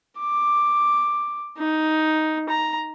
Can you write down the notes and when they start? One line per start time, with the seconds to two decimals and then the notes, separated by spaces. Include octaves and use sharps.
0.20 D6
1.58 D#4
2.49 A#5